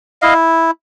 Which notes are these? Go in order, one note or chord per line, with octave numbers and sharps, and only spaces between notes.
E4 D#5 F5